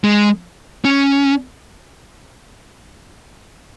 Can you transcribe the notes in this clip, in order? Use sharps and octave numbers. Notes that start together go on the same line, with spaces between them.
G#3
C#4